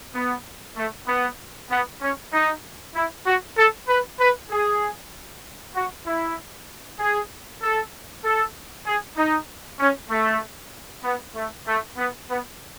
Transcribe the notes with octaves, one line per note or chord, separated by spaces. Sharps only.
B3
A3
B3
B3
C#4
D#4
E4
F#4
A4
B4
B4
G#4
F#4
E4
G#4
A4
A4
G#4
D#4
C#4
A3
B3
A3
A3
B3
B3